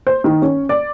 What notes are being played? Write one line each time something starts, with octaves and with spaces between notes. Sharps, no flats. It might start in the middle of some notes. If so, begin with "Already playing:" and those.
C5
D#3
C#4
D5